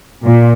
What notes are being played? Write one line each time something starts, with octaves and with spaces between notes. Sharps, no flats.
A#2